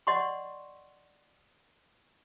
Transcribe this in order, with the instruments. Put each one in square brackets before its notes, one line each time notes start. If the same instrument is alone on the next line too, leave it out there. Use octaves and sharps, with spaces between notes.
[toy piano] D5 D#5 F#5 C6 C#6